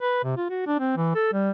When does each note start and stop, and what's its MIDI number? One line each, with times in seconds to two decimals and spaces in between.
0.01 0.20 71
0.24 0.35 48
0.37 0.46 65
0.50 0.64 66
0.67 0.76 62
0.80 0.93 60
0.97 1.11 52
1.15 1.32 69
1.33 1.51 55